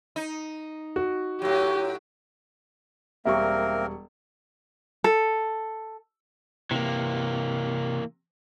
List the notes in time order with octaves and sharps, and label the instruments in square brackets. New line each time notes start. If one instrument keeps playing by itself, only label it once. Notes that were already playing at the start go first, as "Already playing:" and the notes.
[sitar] D#4
[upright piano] F#4
[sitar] A2 F#3 [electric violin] G4
[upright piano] E1 G3 C#6 [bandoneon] A#3 C4 A#4 [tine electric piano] E5
[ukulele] A4
[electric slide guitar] C3 [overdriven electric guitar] E3 A#3